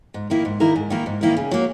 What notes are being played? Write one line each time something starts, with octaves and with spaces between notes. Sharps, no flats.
G#2
D#3 A#3 E4 A#4
G#2
D#3 A#3 E4 A#4
G#2
D#3 A#3 E4 A#4
G#2
D#3 A#3 E4 A#4
C#3
F#3 A#3